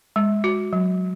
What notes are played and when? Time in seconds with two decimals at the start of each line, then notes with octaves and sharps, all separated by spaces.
0.16 G#3
0.44 F#4
0.73 F#3